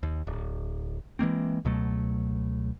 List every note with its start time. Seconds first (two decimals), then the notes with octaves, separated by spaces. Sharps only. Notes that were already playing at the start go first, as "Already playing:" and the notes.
0.03 D#2
0.27 D1
1.19 E3 G#3 A#3 C4
1.65 C#2 B2 F#3 A3